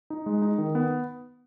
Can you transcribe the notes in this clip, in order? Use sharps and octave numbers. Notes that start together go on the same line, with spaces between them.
D#4
G#3
D#4
D#3
B3